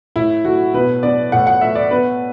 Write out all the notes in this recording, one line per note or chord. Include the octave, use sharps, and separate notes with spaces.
A2 E4
A3 F#4
B2 B4
B3 D5
A2 F#5
F#5
A3 E5
D5
B3 B4